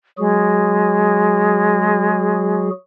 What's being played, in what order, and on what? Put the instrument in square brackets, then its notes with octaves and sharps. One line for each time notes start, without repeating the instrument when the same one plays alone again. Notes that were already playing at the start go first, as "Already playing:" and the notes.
[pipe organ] F#3 F#4 G#4 [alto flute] G#3